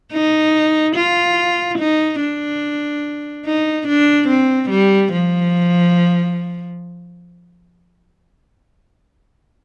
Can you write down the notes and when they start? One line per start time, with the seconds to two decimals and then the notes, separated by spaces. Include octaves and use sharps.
0.12 D#4
0.96 F4
1.79 D#4
2.20 D4
3.46 D#4
3.88 D4
4.28 C4
4.70 G3
5.13 F3